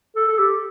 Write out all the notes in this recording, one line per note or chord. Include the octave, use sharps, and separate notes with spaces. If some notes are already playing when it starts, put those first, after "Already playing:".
A4
A4
G4